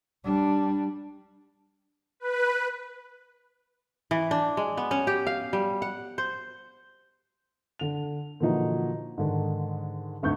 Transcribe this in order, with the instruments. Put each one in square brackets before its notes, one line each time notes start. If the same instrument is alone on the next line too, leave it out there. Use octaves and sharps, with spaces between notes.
[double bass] G3 D4
[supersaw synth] B4
[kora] E3
D4
G#3
B3
C#4
G4
F5
G3
F#5
C5
[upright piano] D3 F7
A#2 D3 E3 F3 D#4 F#4
G#2 D3 D#3
G#1 D2 C#6 G6